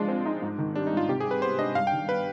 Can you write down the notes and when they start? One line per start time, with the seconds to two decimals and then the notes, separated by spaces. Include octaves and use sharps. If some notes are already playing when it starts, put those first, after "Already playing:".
Already playing: F3 G#3 D4 F4
0.08 C4
0.26 D#4
0.42 G#2
0.58 D#3
0.75 G3 D4
0.87 D#4
0.93 G#2 F4
1.08 C3 G4
1.20 G3 G#4
1.31 B4
1.42 B3 C5
1.59 D4 D#5
1.75 G2 F5
1.87 D#3 G5
2.09 B3 B4